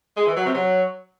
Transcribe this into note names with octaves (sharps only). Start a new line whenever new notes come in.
G#3
E3
F#3
C3
F#3